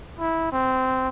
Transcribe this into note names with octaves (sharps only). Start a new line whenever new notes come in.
E4
C4